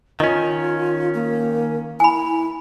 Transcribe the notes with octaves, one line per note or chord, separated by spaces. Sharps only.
D#3 C#4 F4 D#5
A#3
E4 G#5 B5